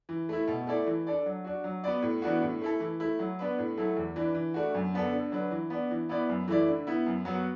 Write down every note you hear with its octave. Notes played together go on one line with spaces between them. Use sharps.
E3
A3 E4
B2
A3 E4 A4 D5
E3
D4 A4 D5
F#3
D4 F#4
F#3
B3 F#4 B4 D5
A2
E3 B3 D4 F#4
A2
A3 E4 A4
E3
A3 E4
F#3
B3 D4 B4
A2
F#3 A3 E4 A4
E2
E3 D4 B4
E3
A3 D4 F#4
F#2
D3 B3 D4 A4
D3
F#3 D4 B4
E3
B3 D4
E3
B3 E4 B4 D5
F#2
E3 A3 E4 D5
D3
B3 E4
F#2
F#3 B3 F#4